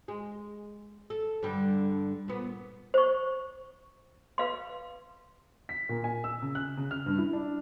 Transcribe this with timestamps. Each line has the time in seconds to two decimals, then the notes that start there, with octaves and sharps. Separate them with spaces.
0.08 G#3
1.10 A4
1.43 G2 D3 G3
2.28 A#2 B3
2.94 C5 C#6
4.38 B4 F5 C6
5.69 B6
5.89 A#2
6.04 G#5
6.24 E6
6.42 C#3
6.55 F#6
6.77 C#3
6.91 F6
7.06 G2
7.18 E4
7.33 D4